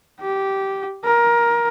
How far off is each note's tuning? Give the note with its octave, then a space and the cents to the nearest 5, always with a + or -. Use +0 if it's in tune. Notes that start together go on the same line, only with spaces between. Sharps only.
G4 -10
A#4 +20